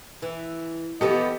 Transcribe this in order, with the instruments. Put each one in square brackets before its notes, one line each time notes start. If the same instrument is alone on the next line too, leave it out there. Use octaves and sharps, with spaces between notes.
[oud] E3
[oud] E3 F3 B3 [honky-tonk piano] G4 A4 [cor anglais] D#5